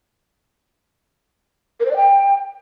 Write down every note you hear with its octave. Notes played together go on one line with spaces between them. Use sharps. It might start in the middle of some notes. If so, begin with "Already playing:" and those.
A#4
C5
D5
G5